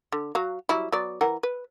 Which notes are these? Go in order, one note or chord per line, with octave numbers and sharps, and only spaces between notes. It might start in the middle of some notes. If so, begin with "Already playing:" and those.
D3
F#3 F#4 F5
F#3 G3 E4
F#3 B3 D5
E3 A#4 F#5
B4